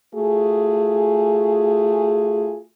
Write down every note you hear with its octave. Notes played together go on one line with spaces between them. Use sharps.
A3 F4 F#4 G#4